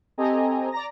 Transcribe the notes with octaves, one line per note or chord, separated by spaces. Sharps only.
C4 G4 A4 D#5 G#5 A#5
D5 A#5 A#6